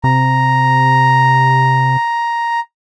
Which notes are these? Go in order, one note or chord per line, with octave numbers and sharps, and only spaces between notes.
C3 A#5